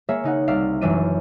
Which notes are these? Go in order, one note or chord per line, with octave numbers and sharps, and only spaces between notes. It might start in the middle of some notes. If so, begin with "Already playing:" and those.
A#3 G#4 C#5 E5
C#3 D#4 F#5
C2 D5 E5 F5
F#1 F#2 E3 D4 E5 D#7